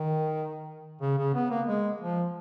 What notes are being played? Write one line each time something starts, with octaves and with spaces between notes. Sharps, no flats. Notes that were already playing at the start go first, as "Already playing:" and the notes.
Already playing: D#3
C#3
C#3
B3
A#3
G#3
F3